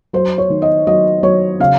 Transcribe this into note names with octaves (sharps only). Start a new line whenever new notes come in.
F#3 C5
C#5
D#3
D#5
F#3 D#5
F#3 C#5
C#3 F5